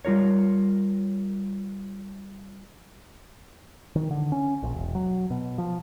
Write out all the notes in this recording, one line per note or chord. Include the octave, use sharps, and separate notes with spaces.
G3 F4 A#4 C#5
D#3
D3
C#4
A#1
E1
F#3
B2
F3